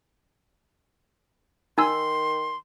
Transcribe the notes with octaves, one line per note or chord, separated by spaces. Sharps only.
D#3 D#4 G#5 C6 E6